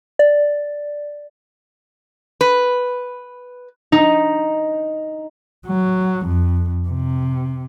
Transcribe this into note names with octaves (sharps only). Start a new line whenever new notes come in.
D5
B4
D#4
F#3
F2
C3